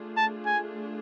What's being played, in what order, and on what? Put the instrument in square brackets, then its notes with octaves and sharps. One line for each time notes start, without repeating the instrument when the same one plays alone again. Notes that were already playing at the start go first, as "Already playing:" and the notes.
Already playing: [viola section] A3 D4 F4 G#4
[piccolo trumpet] A5
G#5